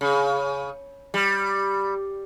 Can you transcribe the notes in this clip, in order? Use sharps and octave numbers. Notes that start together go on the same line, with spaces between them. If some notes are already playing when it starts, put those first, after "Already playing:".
C#3
G3